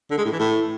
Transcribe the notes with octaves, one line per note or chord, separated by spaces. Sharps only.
D3
G#3
A2
E3
A2